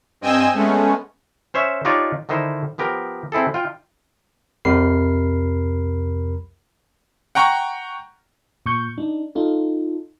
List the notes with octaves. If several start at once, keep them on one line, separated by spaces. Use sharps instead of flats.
G2 C4 D#5 G5 G#5 E6
G#3 A3 B3 C#4
C#4 C5 C#5 E5
D4 D#4 F4 G4 C#5 D5
D3 D#3 D#4 E4 C5
F3 B3 G4 A#4
C4 E4 G#4 A4
F4 G5
C2 F2 C3 A#4 B5 C7
F#5 G5 A#5 C#6
A#2 C#6 G6
D4 D#4
D#4 F4 A4